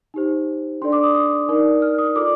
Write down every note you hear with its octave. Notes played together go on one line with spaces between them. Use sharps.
D#4 G4 C5
D4 A4 D5 C6
D6
D#6
D#6
D#4 A#4 D5
F6
D#6
F4 A4 D5 D6